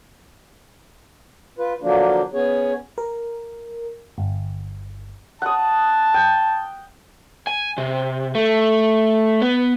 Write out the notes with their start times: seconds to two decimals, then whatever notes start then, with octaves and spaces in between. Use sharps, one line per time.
1.59 F4 B4
1.82 D3 F3 F#3 A#3 D4
2.33 B3 C#4 G#4 C#5
2.98 A#4
4.18 G1
5.42 F#5 A5 D#6
6.14 G5
7.47 G#5
7.78 C3
8.35 A3
9.42 B3